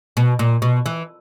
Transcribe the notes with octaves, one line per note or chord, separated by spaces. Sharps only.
B2
A#2
B2
E3